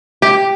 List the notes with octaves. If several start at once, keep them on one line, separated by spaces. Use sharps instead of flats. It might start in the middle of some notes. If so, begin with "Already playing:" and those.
G4